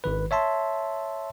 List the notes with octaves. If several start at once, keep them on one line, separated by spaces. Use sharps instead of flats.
G#1 D#3 B4
C#5 E5 A5 C6